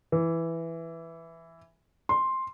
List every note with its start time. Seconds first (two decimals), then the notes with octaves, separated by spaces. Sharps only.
0.12 E3
2.09 C6